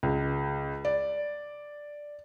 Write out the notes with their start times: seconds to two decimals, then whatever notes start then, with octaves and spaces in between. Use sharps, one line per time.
0.03 C#2
0.85 D5